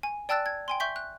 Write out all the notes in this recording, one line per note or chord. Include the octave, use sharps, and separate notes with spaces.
G#5
D5 G5 A5 E6 F#6 A6
G#6
G5 G#5 C6
E5 C#6 G6 B6 G7
F#6